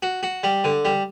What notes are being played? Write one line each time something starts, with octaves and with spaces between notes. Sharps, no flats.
F#4
F#4
G3
D3
G3